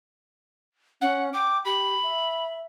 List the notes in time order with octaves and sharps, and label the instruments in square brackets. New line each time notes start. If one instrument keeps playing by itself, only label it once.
[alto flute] C#4 [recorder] F#5
[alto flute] G5 [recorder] D6
[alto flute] G4 [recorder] B5
[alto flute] E5